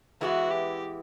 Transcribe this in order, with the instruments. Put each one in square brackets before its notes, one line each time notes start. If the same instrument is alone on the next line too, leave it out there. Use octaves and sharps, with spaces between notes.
[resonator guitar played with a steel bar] E3 G#3 B3 E4 [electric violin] F#4
[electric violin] G4